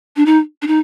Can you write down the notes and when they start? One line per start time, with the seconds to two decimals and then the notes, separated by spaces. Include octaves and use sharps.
0.16 D4
0.26 D#4
0.62 D4
0.67 D#4